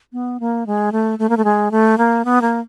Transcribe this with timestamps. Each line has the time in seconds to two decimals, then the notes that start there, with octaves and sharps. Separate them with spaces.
0.13 B3
0.40 A#3
0.66 G#3
0.92 A3
1.19 A3
1.29 A#3
1.37 A3
1.45 G#3
1.71 A3
1.98 A#3
2.25 B3
2.42 A#3